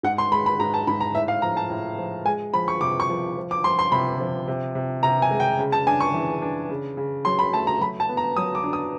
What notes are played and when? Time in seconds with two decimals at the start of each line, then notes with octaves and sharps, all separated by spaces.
0.03 G#2 F#5
0.18 C6
0.32 G#3 B5
0.46 B5
0.59 G#2 A#5
0.74 A5
0.87 G#2 B5
1.00 A#5
1.15 A2 E5
1.28 F5
1.42 F3 A#5
1.57 A5
1.70 A2
1.99 F3
2.25 G#3 G#5
2.54 F3 B5
2.68 C#6
2.81 C3 D6
3.00 C#6
3.10 F3
3.37 F3
3.51 D6
3.64 F3 C6
3.79 C6
3.92 C3 B5
4.20 F3
4.48 C3
4.75 C3
5.03 C3 A#5
5.22 G#5
5.31 G#3
5.40 G5
5.59 C#3
5.72 A5
5.87 D4 G#5
6.01 C#6
6.14 E3
6.42 D4
6.69 C#3
6.97 C#3
7.25 F#3 C6
7.39 B5
7.53 A3 A5
7.67 A#5
7.81 F#3 B5
8.00 A5
8.09 B3
8.17 A#5
8.37 F#3 D#6
8.55 D6
8.64 D4
8.73 D#6